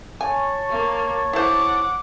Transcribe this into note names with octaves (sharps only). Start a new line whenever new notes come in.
C#5 G#5 A5 C#6
A#3
E4 C5 F#5 D6